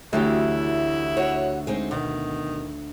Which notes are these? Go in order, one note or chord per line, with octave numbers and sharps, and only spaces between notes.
D2 E3 F#3 E4 G4
F#4 C#5
G#3 C4 D#4
B2 D#3